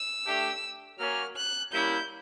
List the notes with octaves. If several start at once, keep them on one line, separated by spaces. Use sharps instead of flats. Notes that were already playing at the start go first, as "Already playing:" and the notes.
Already playing: E6
A3 D4 G4
F#3 A#3 C#4 F6
F#6
G3 A#3 C#4 E4 G6